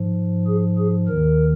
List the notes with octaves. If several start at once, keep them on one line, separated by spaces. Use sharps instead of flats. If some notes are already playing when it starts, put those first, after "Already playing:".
Already playing: G#2 F3
G#4
G#4
D#2 D#3 A#4